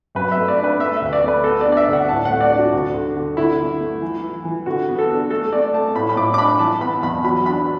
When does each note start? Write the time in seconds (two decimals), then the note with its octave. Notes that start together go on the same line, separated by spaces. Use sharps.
0.15 F#2 B4
0.31 E5
0.37 A3
0.48 D5
0.58 D4
0.64 B4
0.79 A3 E5
0.97 D2 E5
1.13 D5
1.23 A3 B4
1.44 B3 A4
1.61 D5
1.65 D4
1.72 D5
1.77 E5
1.88 D2
1.93 F#5
2.08 A2 A5
2.25 A3 F#5
2.40 D5
2.51 D4
2.58 F#4
2.73 D2
2.94 D3
3.16 D3
3.37 D3 E4
3.59 D3
3.80 A3
4.02 E3
4.23 E3
4.45 E3
4.66 D3 F#4
4.88 B3
4.98 A4
5.09 D4
5.30 A3 A4
5.52 A3 D5
5.74 A3 A5
5.96 A2 B5
6.09 B5
6.16 A2 D6
6.34 D6
6.38 D4 B5
6.59 E3 A5
6.80 B3 B5
7.02 E2 B5
7.24 F#3 B5
7.45 D4 B5